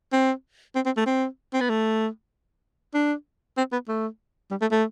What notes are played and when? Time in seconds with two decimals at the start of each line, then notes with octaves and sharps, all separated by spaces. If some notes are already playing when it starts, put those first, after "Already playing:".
0.12 C4
0.75 C4
0.86 C4
0.97 A3
1.06 C4
1.53 C4
1.61 B3
1.70 A3
2.94 D4
3.57 C4
3.72 B3
3.88 A3
4.51 G3
4.61 A3
4.71 A3